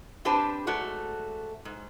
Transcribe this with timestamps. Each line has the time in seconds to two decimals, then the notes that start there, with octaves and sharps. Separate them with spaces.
0.25 C4 D4 G4 B4 C5 A5
0.67 G#2 A3 F#4 D5
1.65 G#2